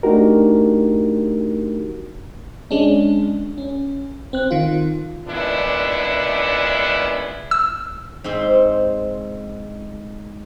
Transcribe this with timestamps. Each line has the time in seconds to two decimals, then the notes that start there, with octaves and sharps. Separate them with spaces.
0.03 A3 D4 D#4 F#4 G4 A#4
2.71 G#3 C#4 D4
3.58 C#4
4.33 C4 F#6
4.51 D#3 F4
5.27 A#2 C#3 G#3 B3 D4 E4
7.51 E6
8.24 G#2 C4 C6